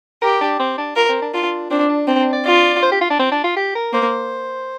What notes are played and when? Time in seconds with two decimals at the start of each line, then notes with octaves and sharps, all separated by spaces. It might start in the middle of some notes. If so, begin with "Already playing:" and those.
0.22 G4 A#4
0.41 D4
0.59 C4
0.78 D4
0.96 F4 A#4
1.09 C4
1.22 D4
1.33 D4 F4
1.70 C4 D4
1.89 D4
2.07 C4 D4
2.20 D4
2.33 D5
2.45 F4 D5
2.82 C5
2.92 G4
3.01 F4
3.10 D4
3.19 C4
3.32 D4
3.44 F4
3.57 G4
3.75 A#4
3.93 A#3 C5